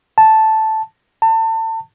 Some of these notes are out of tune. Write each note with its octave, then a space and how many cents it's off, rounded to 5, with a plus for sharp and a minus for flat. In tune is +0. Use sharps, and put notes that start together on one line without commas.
A5 -5
A5 +30